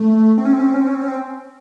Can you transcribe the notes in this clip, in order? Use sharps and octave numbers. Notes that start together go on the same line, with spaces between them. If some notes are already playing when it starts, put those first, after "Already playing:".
Already playing: A3
C4
C#4
C4
C#4
C4
C#4
C4
C#4
C4
C#4
C4